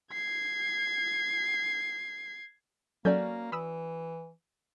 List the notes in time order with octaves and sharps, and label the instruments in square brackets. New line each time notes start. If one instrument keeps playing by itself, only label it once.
[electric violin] G#6 C7
[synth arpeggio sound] F#3 A4 G6 [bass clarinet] A#3 [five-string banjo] C#4 F#4 D5
[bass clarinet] E3 [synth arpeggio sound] B5 D#6 E6